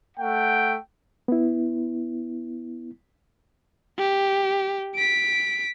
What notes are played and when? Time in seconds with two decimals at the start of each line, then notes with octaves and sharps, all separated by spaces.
0.18 A3 F#5 G5
1.28 B3 E4
3.98 G4
4.95 B6 D7